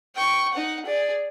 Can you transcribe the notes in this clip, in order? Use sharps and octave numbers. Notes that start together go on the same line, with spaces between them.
G5 C#6
D#4 F#5
G#4 D5